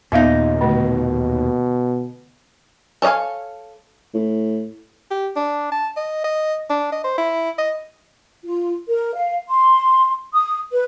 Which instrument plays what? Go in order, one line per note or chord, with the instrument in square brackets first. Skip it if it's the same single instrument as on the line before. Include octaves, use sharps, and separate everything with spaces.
[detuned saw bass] D#2 [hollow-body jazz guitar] A#2 D#4 [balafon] B3 E5 F5
[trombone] B2 [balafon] D3 A3
[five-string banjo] A4 C#5 D#5 F5 G#5
[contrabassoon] A2
[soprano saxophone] G4
D4
A5
D#5
D#5
D4
D#5
C5
E4
D#5
[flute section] F4
A#4
F5
C6
D#6
B4